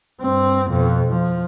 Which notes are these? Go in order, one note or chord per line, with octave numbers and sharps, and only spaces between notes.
G2 C4
F2 B2
F3